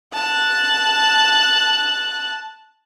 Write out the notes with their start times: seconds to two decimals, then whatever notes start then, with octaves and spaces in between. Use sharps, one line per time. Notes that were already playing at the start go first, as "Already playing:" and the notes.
0.13 A5 F#6